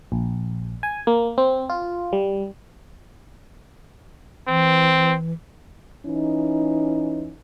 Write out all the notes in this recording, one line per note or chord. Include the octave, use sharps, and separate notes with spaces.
A#1
G#5
A#3
C4
F4
G3
E3 C4
E3 C#4 D#4